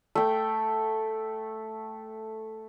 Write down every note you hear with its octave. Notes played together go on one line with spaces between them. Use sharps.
A3 G5